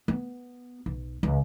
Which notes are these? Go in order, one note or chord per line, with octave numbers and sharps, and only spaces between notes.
B3
B1
C#2